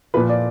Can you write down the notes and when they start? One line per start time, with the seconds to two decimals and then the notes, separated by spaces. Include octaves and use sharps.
0.14 A#2 F3 B4
0.30 D5